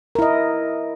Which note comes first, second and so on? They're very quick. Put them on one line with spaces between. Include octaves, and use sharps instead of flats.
A#4 E4 D#5